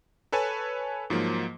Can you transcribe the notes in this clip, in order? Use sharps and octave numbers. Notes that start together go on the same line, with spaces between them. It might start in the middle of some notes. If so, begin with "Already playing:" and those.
A4 B4 C#5 G#5 A5
G#2 F3 F#3 A#3